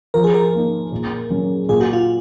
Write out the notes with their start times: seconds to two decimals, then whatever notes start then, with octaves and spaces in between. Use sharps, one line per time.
0.14 F3 A#4
0.24 G#4
0.34 A#4
0.53 A#3 D#4
0.92 A#2
1.30 F#3 C#4
1.69 A#2 G#4
1.81 F#4
1.93 F4